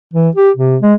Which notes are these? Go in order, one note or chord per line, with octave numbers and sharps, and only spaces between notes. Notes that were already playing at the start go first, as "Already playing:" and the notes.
E3
G4
C3
G#3